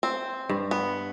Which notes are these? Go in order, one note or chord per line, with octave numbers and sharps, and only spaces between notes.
C4
G2
B3